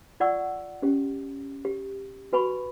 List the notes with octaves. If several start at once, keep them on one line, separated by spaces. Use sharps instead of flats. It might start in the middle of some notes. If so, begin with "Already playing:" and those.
F4 D5 F#5 C#6 E6
C#4 G4
G4
F#4 B4 G#5 B5 C#6